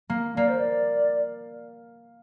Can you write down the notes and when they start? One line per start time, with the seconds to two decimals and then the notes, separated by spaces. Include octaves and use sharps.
0.10 A#3
0.36 A#3 D5
0.48 C5
0.58 D5